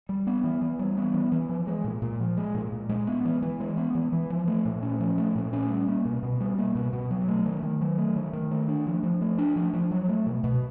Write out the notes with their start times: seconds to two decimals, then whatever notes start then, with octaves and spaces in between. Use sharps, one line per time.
0.09 G3
0.27 B3
0.44 E3
0.62 E3
0.79 G3
0.97 B3
1.14 E3
1.32 E3
1.49 F3
1.67 G#3
1.84 A#2
2.02 A#2
2.20 F3
2.37 G#3
2.54 A#2
2.72 A#2
2.89 G#3
3.07 B3
3.25 E3
3.42 E3
3.60 G#3
3.77 B3
3.95 E3
4.13 E3
4.30 F3
4.48 A3
4.65 A#2
4.82 C#4
5.00 F3
5.18 A3
5.35 A#2
5.53 C#4
5.70 G3
5.88 A#3
6.05 B2
6.23 B2
6.40 G3
6.58 A#3
6.75 B2
6.93 B2
7.11 F#3
7.28 A3
7.46 D#3
7.63 D#3
7.81 F#3
7.98 A3
8.16 D#3
8.33 D#3
8.51 A3
8.68 D4
8.86 F3
9.03 F3
9.21 A3
9.38 D4
9.56 F3
9.73 F3
9.91 F#3
10.09 A3
10.26 B2
10.44 B2